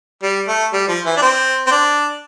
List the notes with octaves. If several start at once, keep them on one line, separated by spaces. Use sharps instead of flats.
G3
A3
G3
F3
E3
D4
C4
C4
D4